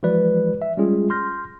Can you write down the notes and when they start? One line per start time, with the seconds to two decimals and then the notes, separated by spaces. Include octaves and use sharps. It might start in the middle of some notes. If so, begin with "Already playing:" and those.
0.03 E3 F3 G#3 F#4 B4 D5
0.62 E5
0.77 G3 G#3 C#4 F4 G#4
1.10 C6 F6 G6 A#6